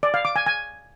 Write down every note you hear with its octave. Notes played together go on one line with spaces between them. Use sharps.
D5
F5
D6
G#5
G#5